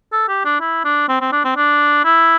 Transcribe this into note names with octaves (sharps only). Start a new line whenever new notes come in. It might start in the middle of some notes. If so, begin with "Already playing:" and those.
A4
G4
D4
E4
D4
C4
C4
D4
C4
D4
E4